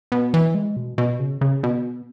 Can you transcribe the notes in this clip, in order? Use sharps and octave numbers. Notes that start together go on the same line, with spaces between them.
B2
E3
G#3
B2
B2
C#3
C#3
B2